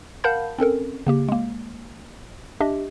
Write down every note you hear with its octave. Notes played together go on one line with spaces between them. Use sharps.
A#4 F5 F#5 A5 B5 G6
C4 C#4 A4 A#4
C#3 A#3 G4
G#3 A#3
D4 G4 D#5 E5